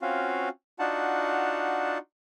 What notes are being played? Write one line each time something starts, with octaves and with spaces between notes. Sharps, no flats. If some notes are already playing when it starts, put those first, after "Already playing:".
C4 C#4 F4 F#4 F5
D4 D#4 F4 F#4 F#5 A5